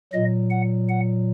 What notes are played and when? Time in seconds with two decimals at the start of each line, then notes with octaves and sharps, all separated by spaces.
0.13 A#2 F#3 D#5
0.50 F#5
0.89 F#5